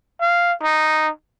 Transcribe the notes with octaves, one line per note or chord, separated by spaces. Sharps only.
F5
D#4